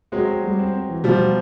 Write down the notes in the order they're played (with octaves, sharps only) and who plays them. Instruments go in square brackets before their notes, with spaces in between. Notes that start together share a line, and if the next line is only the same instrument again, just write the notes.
[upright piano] F#3 G#3 [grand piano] C4
[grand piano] C4
G3
C4
C4
E3
[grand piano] B2 [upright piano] F3 G3
[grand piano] F#3